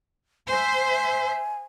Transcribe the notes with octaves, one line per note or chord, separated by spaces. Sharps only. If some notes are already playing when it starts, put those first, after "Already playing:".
C5 E5 G#5